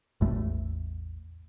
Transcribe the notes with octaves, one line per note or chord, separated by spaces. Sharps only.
A1 E2 A3